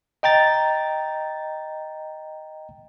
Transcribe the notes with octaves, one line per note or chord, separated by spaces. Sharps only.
D#5 G5 A#5 A6